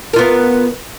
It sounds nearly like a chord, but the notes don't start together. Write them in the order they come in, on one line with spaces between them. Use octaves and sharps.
A#4 F4 B3